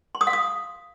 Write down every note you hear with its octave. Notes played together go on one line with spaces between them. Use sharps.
C6
D#6
F5
D#6